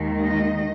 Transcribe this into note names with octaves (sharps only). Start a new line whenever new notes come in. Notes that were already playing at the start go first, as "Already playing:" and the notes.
Already playing: D#2 D#3 G#3
D#5